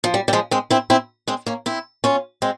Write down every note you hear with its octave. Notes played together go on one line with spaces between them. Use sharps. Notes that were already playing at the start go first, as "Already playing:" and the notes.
F3
G3
G3
F3 G#3
G#3 C4
C4 E4
C4 E4
G#3 C4
A#3 C#4
C4 E4
C#4 F4
G#3 C4